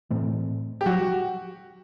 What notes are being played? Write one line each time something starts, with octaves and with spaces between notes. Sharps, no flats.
A2 E3 A3 C4
G4
F#3 F#4